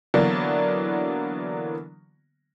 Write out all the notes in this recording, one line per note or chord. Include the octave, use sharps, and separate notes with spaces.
D3 E3 F#3 A#3 B3 D4